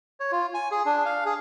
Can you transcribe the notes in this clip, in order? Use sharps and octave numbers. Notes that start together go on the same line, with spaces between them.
C#5
F4
G#5
G#4
D4
F5
G#4